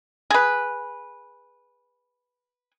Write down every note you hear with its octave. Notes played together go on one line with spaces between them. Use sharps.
G#4 B4